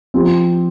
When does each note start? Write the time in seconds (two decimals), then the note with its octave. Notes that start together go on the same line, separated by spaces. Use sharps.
0.14 F3 C4 G4